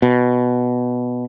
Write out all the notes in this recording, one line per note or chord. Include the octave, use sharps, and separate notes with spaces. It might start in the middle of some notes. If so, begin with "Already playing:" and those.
B2